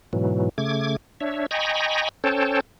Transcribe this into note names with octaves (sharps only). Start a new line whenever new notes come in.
G#2 B2 E3 F#3
C#3 A3 D6 G#6
D4 C#5 E5
D#5 G5 G#5 A#5 B5 C#6
C#4 A4 C5 C#5 G5 A5